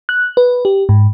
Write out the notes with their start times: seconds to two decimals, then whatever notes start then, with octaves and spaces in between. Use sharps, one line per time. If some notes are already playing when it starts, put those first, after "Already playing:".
0.09 F#6
0.37 B4
0.65 G4
0.89 G#2